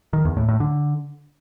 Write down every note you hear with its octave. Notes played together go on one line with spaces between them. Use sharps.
D#3
E2
A2
A2
D3